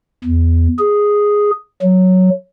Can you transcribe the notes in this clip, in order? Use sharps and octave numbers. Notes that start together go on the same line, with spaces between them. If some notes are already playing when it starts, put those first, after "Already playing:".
E2
G#4
F#3